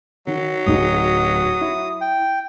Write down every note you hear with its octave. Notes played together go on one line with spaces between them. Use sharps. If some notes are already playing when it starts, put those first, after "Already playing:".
D#3 F#3
D1 D#4 G#4 D#6
E4
G5